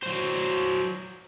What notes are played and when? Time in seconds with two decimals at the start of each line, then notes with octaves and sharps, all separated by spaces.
0.03 F#3 C5